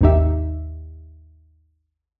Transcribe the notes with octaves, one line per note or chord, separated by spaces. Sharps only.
G#1 D#2 D#3 D#4 G4 E5